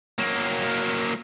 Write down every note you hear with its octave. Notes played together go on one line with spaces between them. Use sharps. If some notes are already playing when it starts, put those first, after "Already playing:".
F#3 A#3